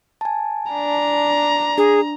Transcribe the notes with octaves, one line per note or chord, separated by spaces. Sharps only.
G#5 A5
D4 A#5
D4 G#4